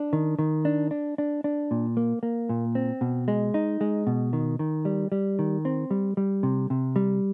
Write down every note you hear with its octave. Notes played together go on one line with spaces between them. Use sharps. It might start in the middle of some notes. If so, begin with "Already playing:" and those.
Already playing: D4
D#3
D#3
D4
D4
D4
D4
A#2
A#3
A#3
A#2
C4
B2
G#3
D#4
G#3
B2
D#3
D#3
G3
G3
D#3
C4
G3
G3
C3
C3
G3